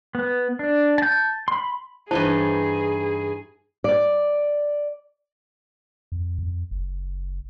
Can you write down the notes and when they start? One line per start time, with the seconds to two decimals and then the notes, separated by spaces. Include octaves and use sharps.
0.15 B3
0.59 D4
0.98 A5 G6
1.48 B5 C6
2.11 G2 E3 D#4 E4 G#4 C5 A5
3.84 D5
6.12 F2
6.39 F2
6.71 F#1